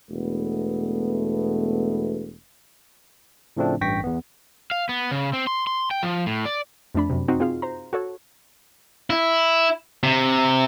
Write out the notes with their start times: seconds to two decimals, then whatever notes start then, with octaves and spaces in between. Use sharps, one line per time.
0.10 E1 A3 B3
3.57 A2 C#3 F3 A3 C4 D4
3.81 A1 G2 G5 C#6 A#6 B6
4.04 E2 B3
4.71 F5
4.89 B3
5.11 C#3
5.33 C4
5.47 C6
5.67 C6
5.91 G5
6.03 F3
6.26 A2
6.46 D5
6.95 F2 A3 D4 B5
7.10 F#2 C3
7.28 C4 D#4 F#4
7.40 C4 F4 G#4 F5
7.62 C5 A#5
7.93 F#4 A4 C#5
9.10 E4
10.03 C3